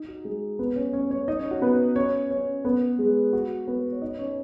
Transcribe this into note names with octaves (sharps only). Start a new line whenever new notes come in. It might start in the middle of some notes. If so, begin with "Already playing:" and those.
Already playing: D#4
F#4
G#3 G#4
B3 B4
C#4 C#5
C#4 C#5
C#4 C#5
D#4 D#5
C#4 C#5
F#4
B3 B4
C#4 C#5
C#4 C#5
B3 B4
G#3 G#4
F#4
B3 B4
C#5
D#4 D#5
C#4 C#5